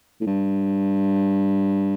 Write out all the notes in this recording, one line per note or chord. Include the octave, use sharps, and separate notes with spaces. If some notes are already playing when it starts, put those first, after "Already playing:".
A2
G2